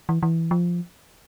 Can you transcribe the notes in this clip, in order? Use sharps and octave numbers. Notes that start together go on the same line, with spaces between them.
E3
E3
F3